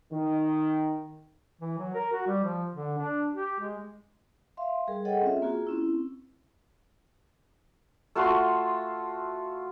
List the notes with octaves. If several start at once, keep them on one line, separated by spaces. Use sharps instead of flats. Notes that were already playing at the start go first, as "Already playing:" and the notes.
D#3
E3
F#3
A#4
F#4
G3
F3
D3
D4
G4
G#3
E5 F5 C6
G3 G#4 A#4
G#4 A4 C#5 D#5 F#5 G5
C4 C#4 F4 E5
A#3 F4 F#4 G#4
C4 C#4 E4
A3 F4 F#4 C6